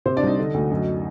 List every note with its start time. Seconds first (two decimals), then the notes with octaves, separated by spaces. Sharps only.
0.06 C3 C4 C5
0.17 D4 D5
0.23 C2 D#4 D#5
0.39 D3
0.54 D2
0.70 F#2